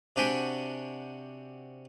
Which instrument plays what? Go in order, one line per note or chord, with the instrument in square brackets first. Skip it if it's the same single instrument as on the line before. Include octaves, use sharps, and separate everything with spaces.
[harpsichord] C3 D4 F#4 G5 G#5 B5